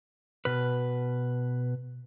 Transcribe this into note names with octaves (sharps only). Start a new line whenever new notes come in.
B2 B4